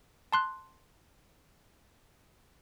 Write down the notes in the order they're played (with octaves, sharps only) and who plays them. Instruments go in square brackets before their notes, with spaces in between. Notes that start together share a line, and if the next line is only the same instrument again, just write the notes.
[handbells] A5 C6 F#6